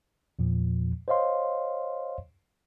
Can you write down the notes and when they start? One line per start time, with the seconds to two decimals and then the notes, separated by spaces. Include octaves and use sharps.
0.39 E2 A#2 F3
1.08 C5 C#5 D#5 F5 C6